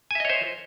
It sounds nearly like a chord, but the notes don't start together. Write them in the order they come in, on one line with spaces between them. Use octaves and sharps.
G#5 E5 D#5 C#5 C5